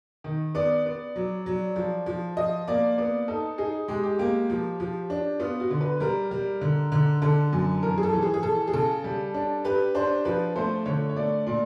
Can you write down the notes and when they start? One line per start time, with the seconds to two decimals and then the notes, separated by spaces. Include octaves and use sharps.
0.24 D#3
0.55 B3 D5
0.86 B3
1.16 F#3
1.46 F#3
1.76 F3
2.06 F3
2.37 F3 D#5
2.68 A#3 D5
2.98 B3 D5
3.28 D#4 A4
3.58 D#4 G#4
3.88 G#3 G4
4.04 G4
4.19 A#3 G4
4.50 F3
4.80 F3
5.10 D4
5.40 B3 F4
5.60 F#4
5.70 D3
5.81 B4
6.00 G3 A#4
6.31 G3
6.61 D3
6.92 D3
7.22 D3 A4
7.53 F#2
7.83 E3 A#4
7.98 G#4
8.03 A4
8.13 E3
8.23 G#4
8.34 G#4
8.43 E3 A4
8.67 G#4
8.73 C#3 A4
9.04 G3
9.34 D4
9.65 G4 B4
9.95 D4 C5
10.25 F3 B4
10.56 A3 C5
10.86 D3 C#5
11.09 C#5
11.16 A3 D5
11.46 A#2 D5